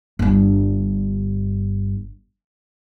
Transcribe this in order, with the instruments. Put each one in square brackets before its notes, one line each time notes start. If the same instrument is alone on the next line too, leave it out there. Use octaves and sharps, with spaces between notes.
[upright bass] G1 G2